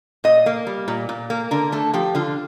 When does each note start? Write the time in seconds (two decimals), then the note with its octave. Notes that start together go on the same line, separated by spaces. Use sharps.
0.24 A#2 D#5
0.46 A#3
0.67 G3
0.88 A#2
1.09 A#2
1.30 A#3
1.51 D3 A#4
1.72 A3 A4
1.94 F3 G4
2.15 D3 F4